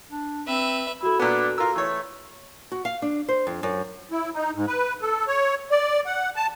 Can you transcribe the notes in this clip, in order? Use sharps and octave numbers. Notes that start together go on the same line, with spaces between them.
D4
C4 B4 E5
E4 F#4 A4
A#2 B3 D4
F4 A#4 E6
E3 A3 C#5
F#4
F5
D4
C5
F2
F#2
E4
D#4
G#2
B4
A4
C#5
D5
F#5
A5